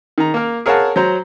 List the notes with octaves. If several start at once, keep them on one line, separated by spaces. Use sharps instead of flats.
D#3 A#5
A#3 A#4
G#4 A#4 C#5 F5 F#5 A5
F#3 C5 A#5